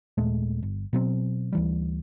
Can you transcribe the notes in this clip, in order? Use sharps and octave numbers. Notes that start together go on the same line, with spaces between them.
D#2 A#2 G#3 A3
G1
B2 F#3 C4
D2 E3 G3